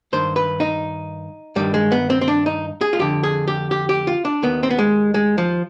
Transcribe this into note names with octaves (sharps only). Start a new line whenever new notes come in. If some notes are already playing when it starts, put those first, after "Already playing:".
G2 D#3 C5
B4
D#4
G2 D#3 G3
G#3
B3
C4
C4
D4
D#4
G#4
F4
F2 D3 G4
G#4
G4
G4
G4
F4
D4
D#2 D#3 B3
C4
B3
G#3
G#3
F3